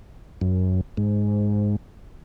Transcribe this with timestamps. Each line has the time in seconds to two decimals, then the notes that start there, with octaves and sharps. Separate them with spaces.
0.41 F#2
0.97 G#2